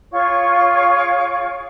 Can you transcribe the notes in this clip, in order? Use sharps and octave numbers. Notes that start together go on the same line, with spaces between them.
F4 G#4 C#5 C#6